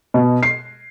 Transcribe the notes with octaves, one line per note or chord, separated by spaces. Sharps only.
B2
C7